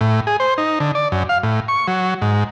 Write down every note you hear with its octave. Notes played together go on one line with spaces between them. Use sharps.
A2
G#4
C5
D#4
D3
D5
F#2
F5
A2
C#6
F#3
G#2